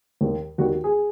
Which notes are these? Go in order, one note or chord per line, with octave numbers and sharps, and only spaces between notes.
D#2 D#3 G3
D#2 D#3 G3 F#4
F#4
G#4